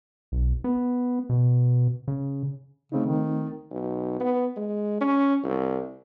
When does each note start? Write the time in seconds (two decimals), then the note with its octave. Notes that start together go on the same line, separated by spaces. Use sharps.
0.32 B1
0.64 B3
1.30 B2
2.08 C#3
2.92 C#3 A3 C4 D#4
3.06 D#3
3.71 B1
4.20 B3
4.57 G#3
5.01 C#4
5.44 C2